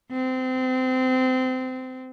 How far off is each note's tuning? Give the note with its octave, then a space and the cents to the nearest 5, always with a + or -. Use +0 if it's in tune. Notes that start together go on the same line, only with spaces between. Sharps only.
C4 -25